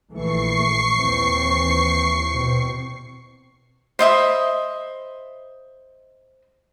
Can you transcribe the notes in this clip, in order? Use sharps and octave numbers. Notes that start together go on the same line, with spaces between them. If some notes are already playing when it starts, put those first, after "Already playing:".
A#1 E3 A3 C#6 C7
D#2 E3 C4
E2 B2 C4
C5 D#5 E5 B5